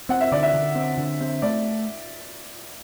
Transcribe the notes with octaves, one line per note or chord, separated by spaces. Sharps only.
C4 F#5
E5
D3 D5
E5
D3
C4
D3
C4
A3 D5